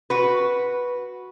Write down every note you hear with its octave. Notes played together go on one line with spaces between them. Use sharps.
F#4 B4